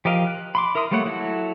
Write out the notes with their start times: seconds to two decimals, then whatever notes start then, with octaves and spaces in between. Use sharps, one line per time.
0.05 F3 G4 A#4 D#5 F5
0.27 F#6
0.55 B5 C6 D6
0.75 E4 A#4 E5 C6 D#6
0.91 G3 A3 A#3 C#5 F#5
1.06 F#3 E4 F#4 A4